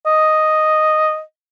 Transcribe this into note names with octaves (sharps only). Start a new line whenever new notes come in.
D#5